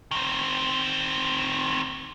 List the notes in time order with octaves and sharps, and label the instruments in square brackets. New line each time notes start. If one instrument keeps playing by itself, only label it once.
[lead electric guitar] D#3 C4